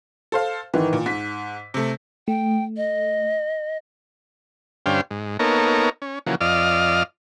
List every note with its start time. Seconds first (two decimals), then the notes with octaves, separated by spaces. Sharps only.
0.32 A4 C5 F5
0.74 G#2 D#3 E3
0.93 A#2
1.06 G#2 B6
1.74 C3 A3
2.28 A3 G5
2.77 D#5
4.86 G2 D3 C#4 C5 F5 G5
5.11 G#2
5.39 A#3 B3 D#4 A4 A#4 C#5
6.02 C#4
6.26 C#3 E3 F3 A#3 F#4
6.41 F2 D5 D#5 F5 F6